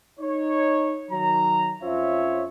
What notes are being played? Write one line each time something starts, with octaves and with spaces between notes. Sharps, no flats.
D#4 C#5
D#3 F#3 A#5
F2 C#4 F4 C5 C#5 E5